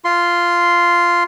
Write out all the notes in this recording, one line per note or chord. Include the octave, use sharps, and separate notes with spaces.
F4 C6